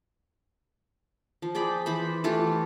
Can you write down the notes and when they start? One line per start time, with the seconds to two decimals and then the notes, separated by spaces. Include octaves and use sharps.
1.42 F3
1.55 G#4 D5 G5 B5
1.86 E3 C5 B5
2.24 E3 A3 F4 G4